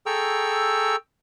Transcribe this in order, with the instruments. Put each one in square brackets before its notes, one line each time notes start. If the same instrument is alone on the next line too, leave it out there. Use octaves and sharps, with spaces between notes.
[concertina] G#4 A4 G5 A#5 C#6 E6